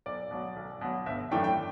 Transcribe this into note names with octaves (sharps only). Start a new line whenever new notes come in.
B1 D5
B2 F#3
B1
B2 F#3
G1 E5
F#2 E3 A3 D4 G5
G5